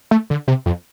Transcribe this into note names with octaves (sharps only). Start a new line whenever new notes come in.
A3
D3
C3
F2